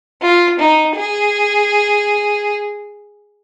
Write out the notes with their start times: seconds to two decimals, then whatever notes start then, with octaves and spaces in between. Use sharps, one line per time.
0.22 F4
0.59 D#4
0.96 G#4